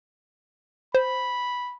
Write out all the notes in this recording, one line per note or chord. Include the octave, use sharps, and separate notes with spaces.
C5 B5